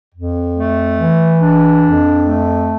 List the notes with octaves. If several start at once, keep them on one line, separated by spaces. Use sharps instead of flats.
F2
A3
E3
D4
F2
A3